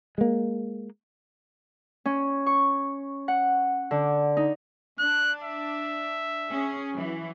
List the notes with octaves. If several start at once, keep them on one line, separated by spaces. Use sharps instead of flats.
G#3 A#3
C#4
C#6
F#5
D3
D#4
D4 F#6
E5
C#4 G#4
E3 F#3